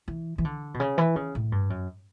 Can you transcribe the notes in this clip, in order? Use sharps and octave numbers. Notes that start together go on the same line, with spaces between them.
E3
E3
D3
B2
C#3
E3
C#3
A2
G2
F#2